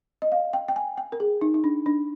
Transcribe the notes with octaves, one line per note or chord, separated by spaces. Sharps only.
D#5
F5
G5
G5
G#5
G5
A#4
G#4
D#4
D#4
D4
D4